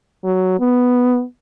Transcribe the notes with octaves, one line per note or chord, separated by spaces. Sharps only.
F#3
B3